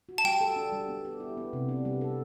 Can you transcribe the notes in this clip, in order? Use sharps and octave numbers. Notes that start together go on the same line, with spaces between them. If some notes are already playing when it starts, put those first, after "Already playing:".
F#4
A5
G3 G5
A4
D4
G3
B3
G4
E4
B3
C3
D4
G3
A4